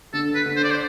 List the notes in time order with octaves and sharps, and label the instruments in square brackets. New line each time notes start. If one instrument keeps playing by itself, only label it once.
[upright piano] D3 [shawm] A4
[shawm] B4
[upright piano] D3
[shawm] C5
D5
C5